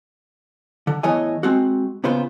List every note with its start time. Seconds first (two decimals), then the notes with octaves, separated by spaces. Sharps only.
0.87 D3
1.03 E2 A2 E3 C#5 D#5 G#5
1.43 G#3 C4 F#4
2.04 A#2 C#3 B3 F4 C5